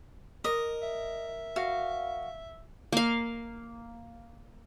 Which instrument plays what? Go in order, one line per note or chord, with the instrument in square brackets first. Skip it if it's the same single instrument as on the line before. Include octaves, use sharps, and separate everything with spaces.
[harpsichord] A#4 [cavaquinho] D#5
[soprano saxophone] E5
[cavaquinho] F#4 F5
[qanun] A#3 F5